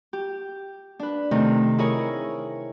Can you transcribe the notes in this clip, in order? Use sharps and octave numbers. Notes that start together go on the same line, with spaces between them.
G4
D4 B4
C3 D#3 A3 C4
E4 G#4 A#4 C#5